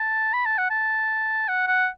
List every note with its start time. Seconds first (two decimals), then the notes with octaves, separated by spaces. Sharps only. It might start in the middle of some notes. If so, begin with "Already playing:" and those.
Already playing: A5
0.34 B5
0.46 A5
0.58 F#5
0.70 A5
1.48 F#5
1.68 F#5